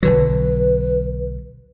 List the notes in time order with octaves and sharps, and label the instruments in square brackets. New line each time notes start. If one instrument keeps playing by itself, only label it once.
[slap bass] B1 D3 F#3 [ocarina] B4